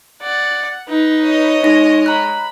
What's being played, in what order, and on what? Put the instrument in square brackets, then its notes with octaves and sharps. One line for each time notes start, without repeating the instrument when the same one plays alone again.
[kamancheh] D5 [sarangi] F#5
[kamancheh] D#4 [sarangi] B4
[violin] C#5 D#5
[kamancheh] G#3 [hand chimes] D#4 A#6
[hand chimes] A#5 F#6 [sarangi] B5